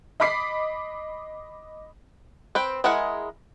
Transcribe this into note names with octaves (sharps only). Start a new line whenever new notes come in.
D#5 B5 D6 B6 C7
C4 B4 G5
G#3 E4 G#4 A#4 F#5